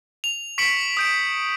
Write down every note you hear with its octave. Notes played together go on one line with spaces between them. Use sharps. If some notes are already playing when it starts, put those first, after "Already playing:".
F7
C#6 B6 C#7 D7 F#7
D#6 G6 D7